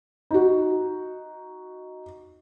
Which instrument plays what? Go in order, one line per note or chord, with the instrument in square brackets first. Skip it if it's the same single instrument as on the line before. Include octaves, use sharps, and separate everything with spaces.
[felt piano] D#4 F#4